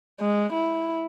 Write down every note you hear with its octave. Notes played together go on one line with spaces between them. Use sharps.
G#3
E4